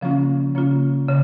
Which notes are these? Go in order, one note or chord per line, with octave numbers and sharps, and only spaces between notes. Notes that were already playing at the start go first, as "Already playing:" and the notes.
C#3 F3 A#3 C#4 F4
C#3 F3 A#3 C#4 F4
C#3